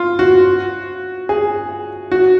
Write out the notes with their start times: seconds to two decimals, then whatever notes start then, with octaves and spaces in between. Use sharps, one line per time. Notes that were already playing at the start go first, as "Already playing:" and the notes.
Already playing: F4
0.19 F#4
1.29 G#4
2.12 F#4